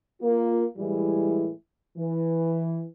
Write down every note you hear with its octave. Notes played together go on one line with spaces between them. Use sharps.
A#3 F4
A2 E3 G3 G#3 E4
E3